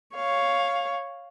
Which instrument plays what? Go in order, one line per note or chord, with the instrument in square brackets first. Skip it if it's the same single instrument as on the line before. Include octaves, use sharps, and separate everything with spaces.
[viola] C#5 [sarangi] F5